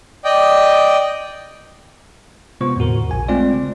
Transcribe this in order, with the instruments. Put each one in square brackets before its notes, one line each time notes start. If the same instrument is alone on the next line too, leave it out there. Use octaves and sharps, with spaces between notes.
[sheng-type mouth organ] D5 D#5 G5
[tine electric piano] C3 G#3 B3 F4 C5 C#6
E2 A2 D3 F#4 A#4
A#1 G#5
G#3 A3 C4 F4 D5
C#3